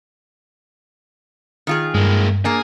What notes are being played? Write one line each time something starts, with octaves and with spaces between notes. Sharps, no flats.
D#3 F4 G#4
G2 G#3 A#3
A#3 D4 G#4